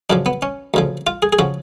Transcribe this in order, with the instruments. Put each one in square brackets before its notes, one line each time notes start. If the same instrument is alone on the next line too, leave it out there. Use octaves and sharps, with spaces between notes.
[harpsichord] F#2 C#3 F3 D4
B3
C#4
D2 C#3 F3
F4
G#4
G#4
C#3 F3 F#4